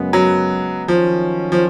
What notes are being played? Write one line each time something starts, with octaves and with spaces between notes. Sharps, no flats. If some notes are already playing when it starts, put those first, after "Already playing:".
Already playing: F#2 C#3 G#3 B3
F#3
D#3 F3 F#3 C#4
F3